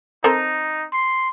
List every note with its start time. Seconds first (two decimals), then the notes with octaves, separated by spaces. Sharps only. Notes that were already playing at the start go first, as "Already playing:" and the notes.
0.24 C4 D#4 A4 A#4
0.93 C6